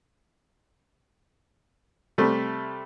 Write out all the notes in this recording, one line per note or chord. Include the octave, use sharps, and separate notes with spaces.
C3 G3 A3